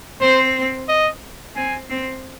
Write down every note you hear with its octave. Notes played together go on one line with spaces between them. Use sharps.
C4 C5
D#5
C4 G#5
C4